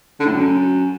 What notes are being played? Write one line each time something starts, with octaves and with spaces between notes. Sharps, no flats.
D3
A2
F#2